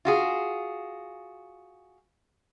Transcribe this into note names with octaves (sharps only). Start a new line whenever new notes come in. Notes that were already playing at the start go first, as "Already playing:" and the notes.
F4 F#4 G#4